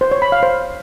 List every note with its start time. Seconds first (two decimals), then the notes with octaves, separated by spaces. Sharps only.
0.01 C5
0.11 C#5
0.22 B5
0.32 F5
0.43 C5